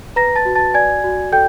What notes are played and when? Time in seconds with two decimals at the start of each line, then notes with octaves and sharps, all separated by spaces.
0.16 B4 A#5 A#6
0.36 A5 A6
0.45 F#4
0.55 A5 A6
0.74 D5 G#5 G#6
1.04 F#4
1.32 A4 G5 G6